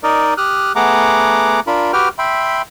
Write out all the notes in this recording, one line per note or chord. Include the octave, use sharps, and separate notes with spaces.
D#4 A#4 D5 D#5
G4 D#6 F6 F#6
A3 B3 G#4 F#5 A#5 D6
D4 F4 A#4 B5
F#4 G4 B4 G5 F6
E5 G5 B5 C6